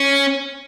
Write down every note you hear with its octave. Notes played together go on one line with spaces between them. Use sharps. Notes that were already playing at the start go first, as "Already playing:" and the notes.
Already playing: C#4